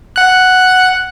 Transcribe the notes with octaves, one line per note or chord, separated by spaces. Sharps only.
F#5 F#6